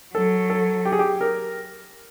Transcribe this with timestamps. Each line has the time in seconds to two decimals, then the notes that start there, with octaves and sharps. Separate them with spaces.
0.15 F#3 A4
0.50 A4
0.85 G4
0.92 G#4
0.99 G4
1.21 A#4